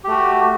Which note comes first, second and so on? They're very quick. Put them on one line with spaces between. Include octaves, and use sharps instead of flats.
G4 A3 F#4